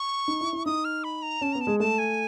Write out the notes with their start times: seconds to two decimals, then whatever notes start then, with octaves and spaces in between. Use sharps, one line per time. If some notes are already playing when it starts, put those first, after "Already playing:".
Already playing: C#6
0.28 D#4
0.41 E4
0.53 E4
0.66 D#4 D#6
0.85 F6
1.04 B5
1.22 A#5
1.41 C#4 A5
1.53 B3 A#5
1.61 A5
1.67 G#3
1.80 A3 A5
1.99 G#5